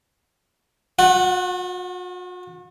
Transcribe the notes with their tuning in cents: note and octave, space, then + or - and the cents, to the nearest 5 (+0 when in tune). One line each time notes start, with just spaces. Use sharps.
F#4 -45 F#5 +0